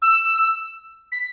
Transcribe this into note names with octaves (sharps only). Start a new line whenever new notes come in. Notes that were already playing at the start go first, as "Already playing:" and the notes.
E6
B6